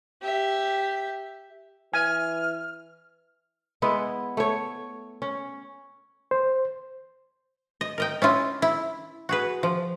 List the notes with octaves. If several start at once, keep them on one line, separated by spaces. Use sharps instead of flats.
G4 E5
E3 G#5 F6
G#3 B3 E4
A3 C#5
C#4
C5
D#5
A#4 D#5 G5
C#4 E4 F4 D#5
E4
F#4 G#4 B4
F3